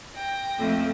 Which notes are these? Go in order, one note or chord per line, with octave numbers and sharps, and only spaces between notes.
G5 A#6
F2 A3